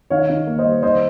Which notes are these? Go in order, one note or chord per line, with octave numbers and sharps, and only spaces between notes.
D#3 C#5 F5
D#3
A#3
C5 D#5
G3
D#3 C5 D#5